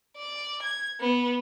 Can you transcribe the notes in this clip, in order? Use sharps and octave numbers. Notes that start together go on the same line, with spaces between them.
D5
G#6
B3